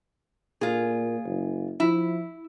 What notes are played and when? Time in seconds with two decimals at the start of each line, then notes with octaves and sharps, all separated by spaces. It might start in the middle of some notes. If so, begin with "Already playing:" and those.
0.61 A#2 F4 G#4
1.25 F#1
1.80 F3 E4